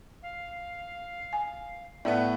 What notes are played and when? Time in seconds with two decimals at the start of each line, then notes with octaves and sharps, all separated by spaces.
0.22 F5
1.33 G#5
2.05 A2 A3 B3 D5 E5